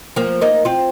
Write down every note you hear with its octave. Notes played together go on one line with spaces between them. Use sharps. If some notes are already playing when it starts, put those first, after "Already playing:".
F3 A#3
A#3 D#4
C4 F4